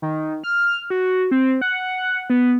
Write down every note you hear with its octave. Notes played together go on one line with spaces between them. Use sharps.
D#3
F6
F#4
C4
F#5
B3